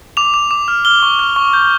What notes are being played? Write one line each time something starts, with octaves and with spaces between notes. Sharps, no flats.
D6 F7
D6
D6
F6
F6 G7
C#6
F6
C#6
G6